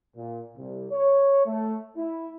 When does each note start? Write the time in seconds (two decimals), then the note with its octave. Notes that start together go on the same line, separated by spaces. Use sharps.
0.16 A#2
0.57 C2
0.91 C#5
1.46 A3
1.97 E4